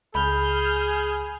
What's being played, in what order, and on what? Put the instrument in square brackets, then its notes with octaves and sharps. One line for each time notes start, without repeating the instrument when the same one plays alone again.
[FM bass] C#2 [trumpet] G#4 [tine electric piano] B5 [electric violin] F6 G6